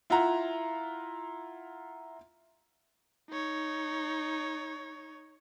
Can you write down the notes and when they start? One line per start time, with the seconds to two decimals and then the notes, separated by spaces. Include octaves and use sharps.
0.10 E4 F4 E5 F#5 A#5
3.30 D#4 C#5